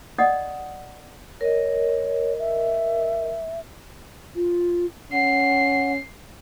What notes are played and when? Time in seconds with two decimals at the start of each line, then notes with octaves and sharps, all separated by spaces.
0.18 D5 D#5 F#5 D#6
1.41 A#4 C#5 D#5
2.39 E5
4.35 F4
5.12 C#4 F#5 C7